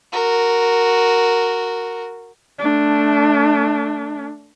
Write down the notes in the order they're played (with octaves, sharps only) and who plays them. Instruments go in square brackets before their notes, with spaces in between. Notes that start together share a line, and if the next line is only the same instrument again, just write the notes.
[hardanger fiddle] F#4 A#4
[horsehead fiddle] A3 D4